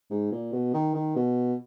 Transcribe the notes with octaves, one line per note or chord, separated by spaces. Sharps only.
G#2
A#2
B2
D#3
D#3
B2